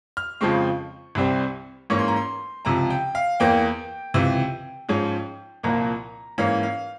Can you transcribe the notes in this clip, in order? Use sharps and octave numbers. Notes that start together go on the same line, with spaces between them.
F6
F2 C#3 F3 G#3 C4 C#6
C2 C3 G3 C4
G#2 E3 A#3 C#4 C#6
C6
A#5
C6
C#2 C3 F3 A#5
G5
F5
E2 E3 A#3 G5
C#2 C3 E3
G#2 F3 G#3 C#4
C2 A#2 F3 A#3 A#5
G#2 E3 A#3 C#4 F5
F5